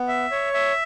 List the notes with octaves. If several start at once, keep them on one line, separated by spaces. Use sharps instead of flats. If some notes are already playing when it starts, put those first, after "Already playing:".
Already playing: B3
E5
C#5
E5